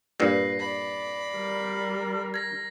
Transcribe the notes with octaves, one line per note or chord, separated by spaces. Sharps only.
G2 A#2 B4 A#6 C7
D5 B5
G3 A#4
G#6 A#6